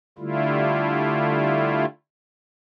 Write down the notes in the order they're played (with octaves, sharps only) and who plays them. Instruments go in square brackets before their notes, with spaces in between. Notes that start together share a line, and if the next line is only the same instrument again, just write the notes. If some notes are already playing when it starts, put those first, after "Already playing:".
[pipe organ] D3 G3 A3 E4 F4